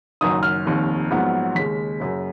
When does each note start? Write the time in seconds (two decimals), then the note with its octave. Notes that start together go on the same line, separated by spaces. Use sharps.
0.21 F#1 F#2 D#3 D#6
0.43 F6
0.66 F1 D#2 D#3
1.11 A#1 G#2 F#3 B3
1.55 D#2 C#3 G#3 B6
2.00 F#1 F#2 C#3